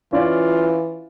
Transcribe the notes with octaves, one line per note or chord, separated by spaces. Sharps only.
E3 C#4 F4 D5